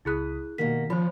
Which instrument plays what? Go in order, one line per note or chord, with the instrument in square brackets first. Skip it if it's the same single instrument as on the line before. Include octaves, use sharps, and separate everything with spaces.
[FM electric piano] C#2 B5 D#6 [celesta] E4 G#4 F#6
[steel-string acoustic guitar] B2 A#3 [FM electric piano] D#3 G3 [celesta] B6
[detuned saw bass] F3 [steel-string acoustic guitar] C#4 [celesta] C5 B5